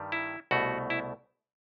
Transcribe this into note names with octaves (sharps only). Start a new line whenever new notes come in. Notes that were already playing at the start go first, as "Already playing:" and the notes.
Already playing: G2 D#3 G3
E4
C2 B2 A3 F#4
E4